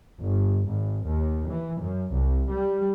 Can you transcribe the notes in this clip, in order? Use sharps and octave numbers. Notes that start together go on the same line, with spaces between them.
G1
G#1
D#2
E3
F#2
C2
G3